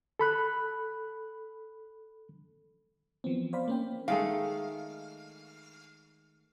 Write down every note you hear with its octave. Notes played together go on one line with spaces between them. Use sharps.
A4 B5 F#6
E3 F3 B3 C4
C5 D5 F5 B5
A#3 C#4 G5
D#3 G#3 A3 F5